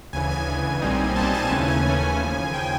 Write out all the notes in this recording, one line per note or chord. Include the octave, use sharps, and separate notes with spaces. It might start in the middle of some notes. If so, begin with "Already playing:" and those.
D2 C#3 E3 G#5
G#5
D2 C#3 E3
B1 A#2 G3 C4 D#4
B1 A#2 G3 C4 D#4 A5
G#5
D#2 C#3 E3 A3 C#4 G#5
G#5
D#2 C#3 E3 A3 C#4
D#2 C#3 F3
C#3 F3 G5